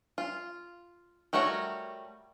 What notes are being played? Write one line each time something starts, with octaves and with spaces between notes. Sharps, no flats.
F4
G3 A3 F#4 A#4 C#5